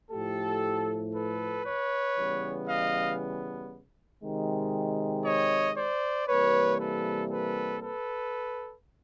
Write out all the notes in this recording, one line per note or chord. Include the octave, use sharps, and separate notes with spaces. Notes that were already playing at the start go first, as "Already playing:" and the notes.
A2 F3 A3 G4 A4
A4 B4
B4 C#5
C#3 E3 G3 B3
D#5 F5
C3 D#3 G#3
C#5 D#5
C5 D5
C3 E3 G3 A#3 B4 C#5
A4 B4
A4 B4
A4 B4